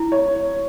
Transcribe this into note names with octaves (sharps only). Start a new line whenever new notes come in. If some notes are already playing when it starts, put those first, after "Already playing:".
Already playing: E4
C#5